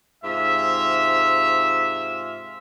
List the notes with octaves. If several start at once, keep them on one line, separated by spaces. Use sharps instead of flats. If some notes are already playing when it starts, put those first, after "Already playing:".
G#2 C3 F4 E5